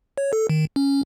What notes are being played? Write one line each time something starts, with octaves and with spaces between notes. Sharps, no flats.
C#5
A4
D#3
C#4